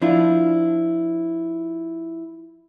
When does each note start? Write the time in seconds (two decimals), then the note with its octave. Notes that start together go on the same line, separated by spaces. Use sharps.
0.02 F3 D4 E4 F4